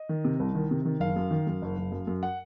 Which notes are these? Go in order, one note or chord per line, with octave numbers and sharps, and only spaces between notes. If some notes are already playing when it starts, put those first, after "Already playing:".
Already playing: D#5
D#3
C3
C2
D#3
C3
D#3
F#1 F5
F#2
D#3
F#2
F#1
F#1
F#2
F#2
F#5